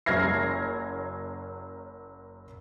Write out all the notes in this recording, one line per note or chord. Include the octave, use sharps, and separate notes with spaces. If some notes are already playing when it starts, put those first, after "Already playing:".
F#1 F#3 F6 G#6 A#6 C7